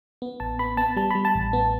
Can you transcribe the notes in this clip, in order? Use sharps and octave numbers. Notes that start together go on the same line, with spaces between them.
B3
A1 A5
B3 B5
B3 A5
G3 A5
G3 B5
A5
A1
B3